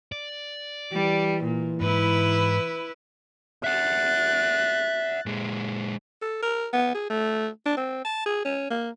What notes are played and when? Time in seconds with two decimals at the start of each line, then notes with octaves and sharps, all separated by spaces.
0.12 D5
0.93 E3 G3
1.44 A#2
1.81 G#2 E4 B4
3.64 E5 F#5 F#6 A6
5.26 A#2 G#3
6.21 A4
6.42 A#4
6.73 B3
6.95 G#4
7.10 A3
7.66 D4
7.77 C4
8.05 A5
8.26 G#4
8.45 C#4
8.70 A#3